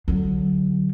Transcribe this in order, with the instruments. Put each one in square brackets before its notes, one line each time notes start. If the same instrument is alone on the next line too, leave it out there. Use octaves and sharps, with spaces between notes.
[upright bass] D3 F#3